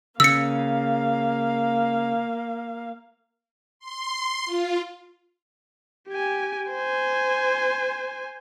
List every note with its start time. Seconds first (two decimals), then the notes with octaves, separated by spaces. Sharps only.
0.20 C#3 A#3 F5 E6 C#7
3.79 C6
4.46 F4
6.08 G4 G#5
6.70 C5 G#5